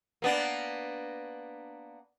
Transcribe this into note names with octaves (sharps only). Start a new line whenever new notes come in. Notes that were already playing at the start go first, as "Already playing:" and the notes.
A#3 B3 D4